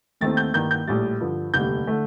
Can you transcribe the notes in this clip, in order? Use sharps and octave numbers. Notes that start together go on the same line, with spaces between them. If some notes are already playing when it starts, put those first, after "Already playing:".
D#2 D#3 A3 C4 A6
G6
G2 D#3 A#3 G6
G6
A#1 A2 G3 A6
G2 D3 F3
F1 D#2 D3 G3 G6
D3 A3